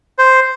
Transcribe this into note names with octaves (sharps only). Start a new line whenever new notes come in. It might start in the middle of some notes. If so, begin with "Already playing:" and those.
C5